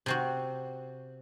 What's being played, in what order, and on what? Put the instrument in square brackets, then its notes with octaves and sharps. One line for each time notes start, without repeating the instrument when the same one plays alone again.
[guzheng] C3 C4 F#4